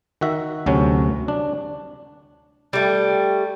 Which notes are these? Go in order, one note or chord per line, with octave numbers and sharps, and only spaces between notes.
D#3 F#4 E5
D2 C3 F#3 C#4
D4
G3 A3